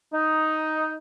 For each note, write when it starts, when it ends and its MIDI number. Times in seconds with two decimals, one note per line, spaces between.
0.13 0.93 63